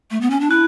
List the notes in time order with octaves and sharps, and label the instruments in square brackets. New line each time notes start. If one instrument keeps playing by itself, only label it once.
[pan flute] A3
B3
C#4
D4
[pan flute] E4 [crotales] F#6